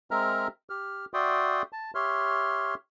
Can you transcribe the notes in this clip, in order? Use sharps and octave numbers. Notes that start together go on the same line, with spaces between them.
G#3 C4 A#4 E5 A#5 F6
G4 F6
F#4 D5 E5 G5 C6 D#6
A5
G4 C#5 E5 C6 F6